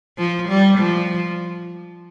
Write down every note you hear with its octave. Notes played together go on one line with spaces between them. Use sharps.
F3
G3
F3